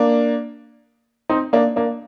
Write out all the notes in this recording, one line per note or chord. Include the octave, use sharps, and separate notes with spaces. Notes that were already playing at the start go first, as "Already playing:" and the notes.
Already playing: A#3 D4
C4 D#4
A#3 D4
A#3 D4